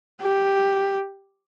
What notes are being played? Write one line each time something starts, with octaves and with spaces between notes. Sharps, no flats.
G4